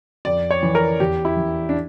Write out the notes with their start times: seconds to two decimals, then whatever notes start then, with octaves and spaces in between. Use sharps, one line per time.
0.25 F2 D5
0.51 C#5
0.63 E3
0.75 A#4
1.00 E2 G4
1.25 E4
1.37 E3
1.69 D4